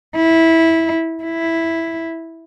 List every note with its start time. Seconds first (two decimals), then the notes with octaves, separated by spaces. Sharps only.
0.16 E4
1.24 E4